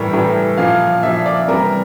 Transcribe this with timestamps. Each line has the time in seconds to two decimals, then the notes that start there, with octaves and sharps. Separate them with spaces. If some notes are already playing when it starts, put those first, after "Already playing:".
Already playing: A2 E3 G3 A#4
0.13 A2 E3 G3
0.57 A#2 F3 F5
1.03 A#2 F3 E5
1.26 D5
1.48 C3 E3 G3 A#4